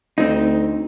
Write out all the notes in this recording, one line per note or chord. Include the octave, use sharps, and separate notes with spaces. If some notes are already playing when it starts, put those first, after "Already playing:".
D2 C4 D#4